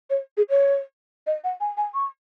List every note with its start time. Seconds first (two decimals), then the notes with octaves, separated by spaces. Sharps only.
0.10 C#5
0.37 G#4
0.50 C#5
1.27 D#5
1.44 F#5
1.61 G#5
1.77 G#5
1.94 C#6